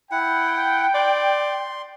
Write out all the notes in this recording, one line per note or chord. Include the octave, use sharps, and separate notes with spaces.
E4 F#5 G5
D5 C6